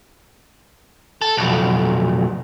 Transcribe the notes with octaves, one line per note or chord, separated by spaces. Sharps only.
A4
B1 F2